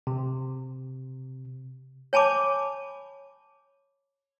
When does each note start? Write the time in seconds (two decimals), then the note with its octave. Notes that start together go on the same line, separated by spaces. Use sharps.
0.07 C3
2.13 C#5 G#5 A5 B5 D6